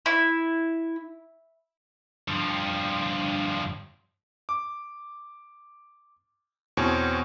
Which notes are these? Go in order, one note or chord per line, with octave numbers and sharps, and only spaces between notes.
E4
G2 F3
D6
E2 B2 C4 C#5